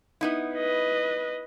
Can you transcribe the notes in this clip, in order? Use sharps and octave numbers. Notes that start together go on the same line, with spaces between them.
B3 D#4 E4
B4 D#5